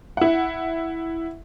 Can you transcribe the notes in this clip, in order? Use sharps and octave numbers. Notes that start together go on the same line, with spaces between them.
E4 F#5